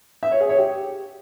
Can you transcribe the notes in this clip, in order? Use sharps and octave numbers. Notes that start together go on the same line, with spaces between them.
E5
C#5
G#4
C#5
G4